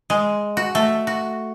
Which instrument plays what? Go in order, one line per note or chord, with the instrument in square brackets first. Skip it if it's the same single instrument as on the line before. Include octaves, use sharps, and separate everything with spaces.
[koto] G#3
F#4
A3
F#4